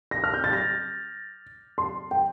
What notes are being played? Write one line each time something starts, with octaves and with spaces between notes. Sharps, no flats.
A#6
F6
G6
A6
A#6
C6
G5